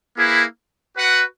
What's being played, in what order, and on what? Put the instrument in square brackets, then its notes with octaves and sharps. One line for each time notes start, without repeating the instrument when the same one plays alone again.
[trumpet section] A#3 E4 G#4 B4
F#4 B4 F#5